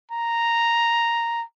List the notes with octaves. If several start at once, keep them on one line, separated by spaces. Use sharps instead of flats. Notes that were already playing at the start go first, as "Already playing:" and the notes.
A#5